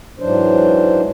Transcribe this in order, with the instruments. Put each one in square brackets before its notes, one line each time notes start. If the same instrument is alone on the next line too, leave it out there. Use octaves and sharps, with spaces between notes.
[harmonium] G#2 E3 F#3 D4 C5